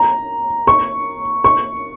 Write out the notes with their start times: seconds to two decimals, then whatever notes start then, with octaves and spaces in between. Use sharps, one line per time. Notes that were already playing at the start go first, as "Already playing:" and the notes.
Already playing: A#5
0.67 C#6
1.44 C#6